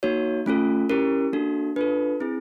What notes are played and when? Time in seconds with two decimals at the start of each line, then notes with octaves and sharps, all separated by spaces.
0.03 A#3 D#4 F#4 C#5
0.46 A3 C#4 F4 A4
0.90 C#4 E4 G4 A#4
1.33 A#3 D4 F#4 A4
1.76 D4 F4 A4 B4
2.20 C4 E4 G#4